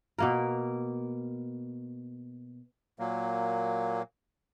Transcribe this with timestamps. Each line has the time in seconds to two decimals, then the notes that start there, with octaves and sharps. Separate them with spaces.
0.18 B2 A#3 A#4
2.99 A#2 F#3 A#3